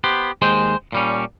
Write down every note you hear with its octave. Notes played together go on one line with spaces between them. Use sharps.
B3 G4 C5
D#2 G#3 G#4 C5 G5
A#2 G3 C#4